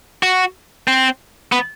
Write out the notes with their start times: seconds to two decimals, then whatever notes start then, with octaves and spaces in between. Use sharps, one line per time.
0.23 F#4
0.88 C4
1.52 B3